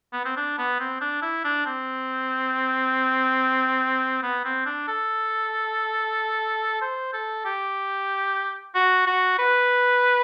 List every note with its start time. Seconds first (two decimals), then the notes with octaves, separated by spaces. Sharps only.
0.13 B3
0.25 C4
0.37 D4
0.58 B3
0.80 C4
1.01 D4
1.22 E4
1.44 D4
1.66 C4
4.23 B3
4.45 C4
4.66 D4
4.88 A4
6.82 C5
7.13 A4
7.45 G4
8.75 F#4
9.07 F#4
9.39 B4